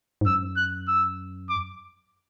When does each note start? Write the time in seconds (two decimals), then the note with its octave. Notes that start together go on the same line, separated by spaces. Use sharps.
0.21 G#2
0.26 F#2 E6
0.56 F#6
0.88 E6
1.49 D6